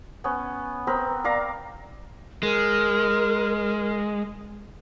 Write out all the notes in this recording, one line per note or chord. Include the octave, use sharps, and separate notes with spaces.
B3 C#4
B3 C4 A#4 B5
A#4 D5 F5 A#5
G#3 A#4